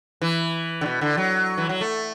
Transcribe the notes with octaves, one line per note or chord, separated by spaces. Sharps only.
E3
D3
B2
D3
F#3
E3
F#3
A3